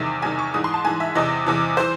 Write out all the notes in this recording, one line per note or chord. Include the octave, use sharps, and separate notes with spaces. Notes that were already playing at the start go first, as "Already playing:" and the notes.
Already playing: E2 C3 D#3 E5
E2 C3 D#3 G#5
C#6
G#2 E3 D#6
C6
A5
G#2 E3 G#5
E5
E2 C3 E3 D#5
E2 C3 E3
E3 C5